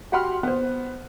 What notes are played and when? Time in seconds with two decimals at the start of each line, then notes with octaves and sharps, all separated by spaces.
0.12 F#4 G4 F#5 B5 C6 F6
0.43 B3 C5